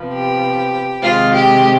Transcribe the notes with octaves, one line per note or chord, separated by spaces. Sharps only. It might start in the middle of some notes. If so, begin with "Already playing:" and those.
Already playing: C3 F3 B3
G4
C3 D#3 G#3 F4
G4